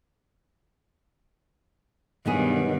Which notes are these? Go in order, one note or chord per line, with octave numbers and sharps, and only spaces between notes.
G2 B2 D#3 F#3 B3 G#4